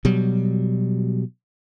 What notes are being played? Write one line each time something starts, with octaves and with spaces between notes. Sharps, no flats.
B2 F#3 G3